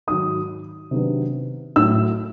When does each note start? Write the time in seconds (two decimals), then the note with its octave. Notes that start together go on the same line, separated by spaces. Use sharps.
0.07 G#2 D#3 F#3 D#6
0.91 C3 D#3 F#3 B3 D4
1.76 A2 F#3 E6